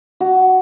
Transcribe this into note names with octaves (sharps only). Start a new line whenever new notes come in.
F#4